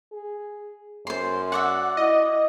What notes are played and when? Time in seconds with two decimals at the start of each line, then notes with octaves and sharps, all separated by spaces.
0.12 G#4
1.07 F#2 C5 C6
1.52 F#4 D5 E5 F#5
1.97 E4 D#5